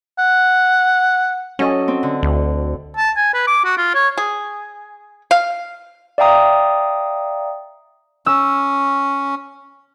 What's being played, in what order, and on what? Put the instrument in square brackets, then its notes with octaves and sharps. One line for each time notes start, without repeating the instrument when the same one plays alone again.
[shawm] F#5
[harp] F#3 A4 D#5 [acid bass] C#4
[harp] C4
D3
[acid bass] D2
[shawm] A5
G#5
B4
D6
F#4
F4
C#5
[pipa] G#4
F5
[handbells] D5 E5 F5 G5 A#5 D#6
[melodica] C#4 [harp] E6